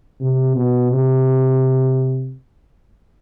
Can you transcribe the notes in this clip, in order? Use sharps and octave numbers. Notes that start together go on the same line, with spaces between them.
C3
B2
C3